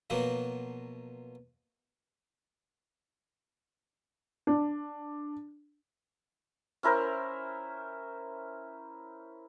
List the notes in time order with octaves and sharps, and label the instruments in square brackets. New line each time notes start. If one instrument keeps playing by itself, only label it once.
[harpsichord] B2 F3 F#3 A#3 F#4
[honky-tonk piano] D4
[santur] C#4 E4 A#4 C5